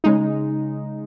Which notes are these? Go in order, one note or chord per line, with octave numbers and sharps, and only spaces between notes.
C#3 G#3 D#4